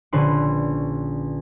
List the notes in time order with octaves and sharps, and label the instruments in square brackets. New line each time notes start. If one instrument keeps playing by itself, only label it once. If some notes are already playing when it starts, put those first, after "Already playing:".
[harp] A#1 D3 C#4 B4 C6